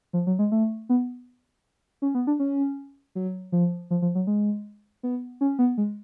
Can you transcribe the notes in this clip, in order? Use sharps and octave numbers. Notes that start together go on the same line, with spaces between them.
F3
F#3
G#3
A3
B3
C#4
B3
D4
C#4
F#3
F3
F3
F3
F#3
G#3
B3
C#4
B3
G#3